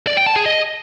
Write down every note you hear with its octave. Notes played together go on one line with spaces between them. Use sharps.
D5
G5
A5
G#4
D#5